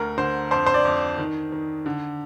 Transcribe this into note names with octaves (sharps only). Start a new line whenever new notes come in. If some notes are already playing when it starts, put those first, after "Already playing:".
Already playing: D2 A#4
D3 C5
F2 C5
C5
D5
F2
D#3
D#3
D3